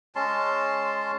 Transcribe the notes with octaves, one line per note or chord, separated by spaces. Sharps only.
G#3 C#4 A5 C6